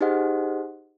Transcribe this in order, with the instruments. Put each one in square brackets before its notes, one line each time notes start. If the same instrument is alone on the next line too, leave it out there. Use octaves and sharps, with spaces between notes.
[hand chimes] D#4 G4 G#4 C5 D#5 F#5